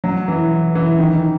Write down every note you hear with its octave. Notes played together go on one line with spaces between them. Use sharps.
F#3
E3
E3
D#3